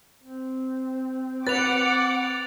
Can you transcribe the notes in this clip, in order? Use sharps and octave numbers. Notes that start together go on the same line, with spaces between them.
C4
B4 F#5 D6 A6 F7